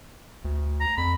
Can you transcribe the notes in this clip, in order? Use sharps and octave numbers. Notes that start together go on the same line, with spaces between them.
D2
A#5
F2 B5